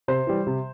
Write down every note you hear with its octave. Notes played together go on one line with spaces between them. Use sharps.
C3 C5
E3 G3
C3